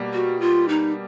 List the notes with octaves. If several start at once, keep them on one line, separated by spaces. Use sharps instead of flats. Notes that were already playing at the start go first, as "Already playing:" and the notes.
Already playing: B2 G3 A#3
F#4
F4
D#4